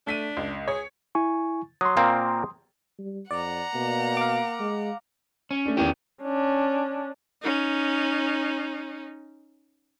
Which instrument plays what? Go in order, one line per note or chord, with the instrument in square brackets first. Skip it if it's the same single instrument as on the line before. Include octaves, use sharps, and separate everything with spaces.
[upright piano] A3 B6 D#7 [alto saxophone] D4
[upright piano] C#2
[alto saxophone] G#4 [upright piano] C#5
[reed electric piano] E4 G#5 C#6
[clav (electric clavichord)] F#3 [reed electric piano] C6 D#6
[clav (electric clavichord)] A#2 A#3 C4
[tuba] G3
[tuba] F2 [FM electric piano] D5 [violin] F#5 A#5
[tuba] B2 [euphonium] A#3
[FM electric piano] F5 D6
[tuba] G#3
[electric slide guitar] C#4
[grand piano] A3 D4
[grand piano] E2 D#3 E3 [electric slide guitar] C#4 G4
[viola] C#4 D4
C#4 D#4